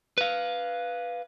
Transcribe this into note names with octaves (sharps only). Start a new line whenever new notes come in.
B4 F5